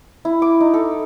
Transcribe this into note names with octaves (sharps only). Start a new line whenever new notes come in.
E4
D6
D#4
A4